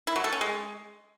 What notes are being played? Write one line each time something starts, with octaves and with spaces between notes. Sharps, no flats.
E4
F#3
A4
C#4
G#3